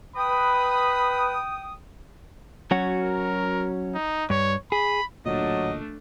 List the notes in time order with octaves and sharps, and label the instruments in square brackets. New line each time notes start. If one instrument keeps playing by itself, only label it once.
[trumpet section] B4 B5 [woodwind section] G5 D#6
[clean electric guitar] F#3 C#4 F#4
[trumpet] A#4
D#4
[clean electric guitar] G2 [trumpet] C#5
[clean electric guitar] G#4 [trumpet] B5
[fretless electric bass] A1 D2 A#2 [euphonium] F#3 [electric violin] A3 D4 [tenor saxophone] D#5